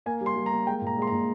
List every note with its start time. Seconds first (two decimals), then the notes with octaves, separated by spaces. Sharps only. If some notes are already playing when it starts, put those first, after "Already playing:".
0.06 A#3 G#5
0.21 G3
0.26 C6
0.36 G3
0.46 A#5
0.52 A#3
0.67 G#3 G5
0.82 A#2
0.87 A#5
0.97 G#3 C6
1.07 A#5
1.12 A#2